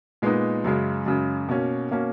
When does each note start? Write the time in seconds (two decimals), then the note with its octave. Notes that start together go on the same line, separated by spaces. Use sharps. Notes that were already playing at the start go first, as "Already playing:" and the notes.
0.22 A#2 G#3 B3 D#4
0.64 F#2 C#3 G#3
1.06 F#2 C#3 G#3
1.49 B2 A#3 C#4
1.91 B2 A#3 C#4